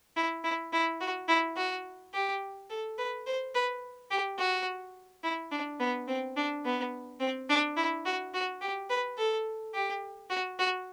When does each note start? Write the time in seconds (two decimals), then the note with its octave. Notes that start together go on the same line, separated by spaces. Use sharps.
0.16 E4
0.44 E4
0.73 E4
1.01 F#4
1.28 E4
1.56 F#4
2.14 G4
2.70 A4
2.98 B4
3.26 C5
3.55 B4
4.10 G4
4.38 F#4
5.23 E4
5.51 D4
5.80 B3
6.08 C4
6.36 D4
6.65 B3
7.20 C4
7.49 D4
7.77 E4
8.05 F#4
8.34 F#4
8.61 G4
8.90 B4
9.18 A4
9.74 G4
10.30 F#4
10.59 F#4